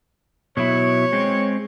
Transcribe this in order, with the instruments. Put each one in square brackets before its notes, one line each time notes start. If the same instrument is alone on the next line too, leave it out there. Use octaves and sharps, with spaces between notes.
[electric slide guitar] B2 F#3 E4 [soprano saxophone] C#5
[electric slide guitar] G#3 C4